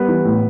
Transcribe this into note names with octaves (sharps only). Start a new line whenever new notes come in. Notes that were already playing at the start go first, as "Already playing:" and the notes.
Already playing: G3 B3 B4
E3
A2